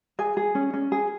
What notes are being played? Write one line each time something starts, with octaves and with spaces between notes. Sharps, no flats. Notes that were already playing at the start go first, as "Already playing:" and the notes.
G#4 G#5
G#4
C#4
C#4
G#4